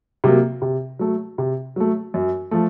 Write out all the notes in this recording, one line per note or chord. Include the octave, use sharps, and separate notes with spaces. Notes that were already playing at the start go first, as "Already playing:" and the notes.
C3 F#3 A#3
C3
F#3 A3
C3
F#3 A3
F#2
F3 A3